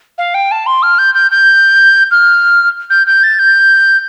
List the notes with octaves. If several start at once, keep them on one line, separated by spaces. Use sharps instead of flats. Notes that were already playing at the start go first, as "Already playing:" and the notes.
F5
G5
A5
C6
F6
G6
G6
G6
F6
G6
G6
A6
G6